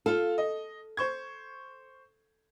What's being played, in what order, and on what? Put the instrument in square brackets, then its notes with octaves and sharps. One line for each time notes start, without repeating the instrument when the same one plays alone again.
[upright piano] F4 F5 [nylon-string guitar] A4
[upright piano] D#5
C5 C#6 G#6